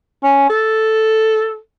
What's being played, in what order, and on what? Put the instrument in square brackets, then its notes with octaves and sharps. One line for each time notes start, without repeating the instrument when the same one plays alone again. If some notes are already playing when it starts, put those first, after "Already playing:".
[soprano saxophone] C#4
A4